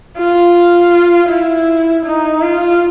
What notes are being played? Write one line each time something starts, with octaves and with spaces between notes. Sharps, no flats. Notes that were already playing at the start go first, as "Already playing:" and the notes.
F4
E4
D#4
F4